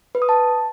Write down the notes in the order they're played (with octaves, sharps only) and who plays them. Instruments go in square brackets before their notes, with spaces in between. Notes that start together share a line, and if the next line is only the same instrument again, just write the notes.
[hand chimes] B4
D#6
A5